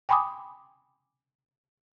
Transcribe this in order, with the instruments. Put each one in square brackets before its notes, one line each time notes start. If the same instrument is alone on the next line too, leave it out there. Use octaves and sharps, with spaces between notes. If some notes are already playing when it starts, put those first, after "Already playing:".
[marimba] G5 G#5 B5 C6 D6 D#6